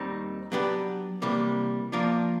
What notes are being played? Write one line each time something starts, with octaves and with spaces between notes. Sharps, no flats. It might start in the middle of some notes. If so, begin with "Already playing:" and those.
Already playing: D#2 D#3 G3 C4 D#4
F#3 B3 D4 G4 B4
C3 E3 G3 A#3
F3 A#3 D4 F4 A#4